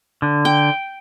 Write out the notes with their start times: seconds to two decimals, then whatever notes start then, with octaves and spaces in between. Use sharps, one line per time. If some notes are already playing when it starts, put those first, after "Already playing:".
0.22 D3
0.45 G5